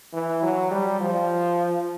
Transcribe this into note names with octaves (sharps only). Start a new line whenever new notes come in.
E3
F#3
G3
F3